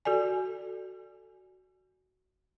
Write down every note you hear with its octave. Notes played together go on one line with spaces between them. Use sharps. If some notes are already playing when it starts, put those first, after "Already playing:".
F#4 A4 D5 G#5